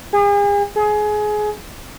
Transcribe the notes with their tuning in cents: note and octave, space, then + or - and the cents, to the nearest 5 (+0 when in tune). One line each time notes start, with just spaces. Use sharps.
G#4 -40
G#4 +20